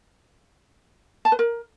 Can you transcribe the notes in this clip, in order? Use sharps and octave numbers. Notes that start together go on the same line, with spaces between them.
A5
B4
A#4